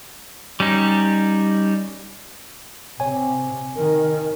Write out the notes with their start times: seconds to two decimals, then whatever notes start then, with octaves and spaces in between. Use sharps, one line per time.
0.60 G3 C#4 D#4
3.00 C3 C#5 G#5
3.76 D#3 A#4